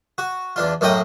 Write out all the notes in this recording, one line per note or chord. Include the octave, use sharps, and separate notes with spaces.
F#4
E2 D4 F4
F#2 A2 A#3 D#5 G5 D#6